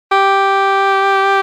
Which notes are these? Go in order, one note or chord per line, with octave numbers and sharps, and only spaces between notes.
G4